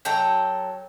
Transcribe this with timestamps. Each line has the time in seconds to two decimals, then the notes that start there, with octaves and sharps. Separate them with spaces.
0.05 F#3 A4 G5 A#5